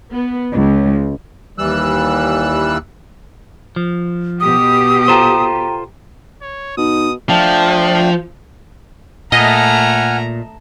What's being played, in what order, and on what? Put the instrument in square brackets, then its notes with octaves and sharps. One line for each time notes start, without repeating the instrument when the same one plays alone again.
[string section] B3
C#2
[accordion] D#2 E3 G3 E6 F#6
[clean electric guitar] F3
[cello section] B2 G4 [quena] D#6
[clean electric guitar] F4 A4 C5 [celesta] G5 A#5 D#7
[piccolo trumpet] C#5
[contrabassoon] B2 [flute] D#4 [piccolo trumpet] D#6
[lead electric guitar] F3 [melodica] A3 D4 G5
[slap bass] A#2 [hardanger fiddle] A3 A#5 [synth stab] D#5 [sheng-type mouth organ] F#5 G#5 F6